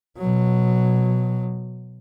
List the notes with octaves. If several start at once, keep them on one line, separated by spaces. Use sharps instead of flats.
B2 F#3